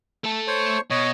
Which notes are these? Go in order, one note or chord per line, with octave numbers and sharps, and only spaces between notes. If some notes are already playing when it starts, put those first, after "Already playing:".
A3 A4
C5 C#5 C#6
B2 C#5 D#5